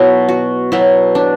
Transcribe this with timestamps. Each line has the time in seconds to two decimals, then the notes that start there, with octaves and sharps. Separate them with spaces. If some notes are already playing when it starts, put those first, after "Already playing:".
Already playing: B2 F#3 B3 E4
0.29 F#4
0.72 B2 F#3 B3 E4
1.15 D4